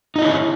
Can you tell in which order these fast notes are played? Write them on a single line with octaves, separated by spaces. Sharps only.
D#4 D#5 E4 C#5